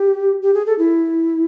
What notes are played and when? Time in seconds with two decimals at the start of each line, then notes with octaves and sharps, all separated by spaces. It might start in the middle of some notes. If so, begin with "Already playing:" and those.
Already playing: G4
0.42 G4
0.54 G#4
0.66 A4
0.78 E4